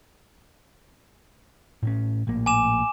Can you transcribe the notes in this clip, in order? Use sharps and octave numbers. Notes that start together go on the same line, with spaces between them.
A2 C4 C#4
A#1 A2 A#3
G#5 D6 E7